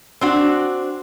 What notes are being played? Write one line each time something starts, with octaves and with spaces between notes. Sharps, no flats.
C4 D4 F#4